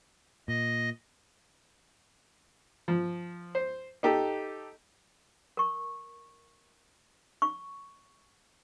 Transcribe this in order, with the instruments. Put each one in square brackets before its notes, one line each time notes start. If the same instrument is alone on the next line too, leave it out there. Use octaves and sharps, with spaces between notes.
[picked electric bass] A#2 [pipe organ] D#5
[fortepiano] F3
C5
D#4 G4 A4
[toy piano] A#4 C#6
C#6